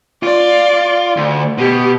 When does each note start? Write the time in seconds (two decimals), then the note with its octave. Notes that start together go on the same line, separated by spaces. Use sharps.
0.23 F4 D5
1.17 D2
1.58 B2 G4